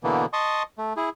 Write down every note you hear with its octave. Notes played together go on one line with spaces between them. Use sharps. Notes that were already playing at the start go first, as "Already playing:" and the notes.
B2 D3 E3 A#3 B3
D#5 A5 C6 C#6 D#6
A3
E4 G#4